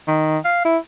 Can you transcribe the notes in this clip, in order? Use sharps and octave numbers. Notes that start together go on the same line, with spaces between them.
D#3
F5
E4